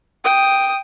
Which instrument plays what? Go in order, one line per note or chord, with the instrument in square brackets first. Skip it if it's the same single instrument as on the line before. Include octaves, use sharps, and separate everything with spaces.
[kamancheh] G5 D#6